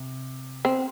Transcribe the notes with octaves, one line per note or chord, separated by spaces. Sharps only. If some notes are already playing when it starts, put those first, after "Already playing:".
Already playing: C3
C4